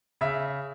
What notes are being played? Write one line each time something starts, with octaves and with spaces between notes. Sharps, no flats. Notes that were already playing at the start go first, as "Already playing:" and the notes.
C#3 E5